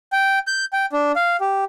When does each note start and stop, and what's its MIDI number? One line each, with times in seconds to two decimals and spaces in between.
0.12 0.39 79
0.47 0.65 91
0.73 0.86 79
0.92 1.12 62
1.16 1.36 77
1.40 1.65 67